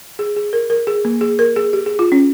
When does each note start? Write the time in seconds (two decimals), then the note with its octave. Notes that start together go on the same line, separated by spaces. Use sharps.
0.19 G#4
0.36 G#4
0.53 A#4
0.70 A#4
0.87 G#4
1.05 A#3
1.21 G#4
1.39 A#4
1.56 G#4
1.73 G4
1.86 G#4
1.99 F4
2.12 C#4